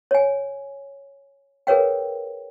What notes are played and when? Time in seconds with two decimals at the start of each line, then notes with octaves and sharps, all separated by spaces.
0.11 C#5 G#5
1.67 G#4 A#4 B4 C#5 F5 G5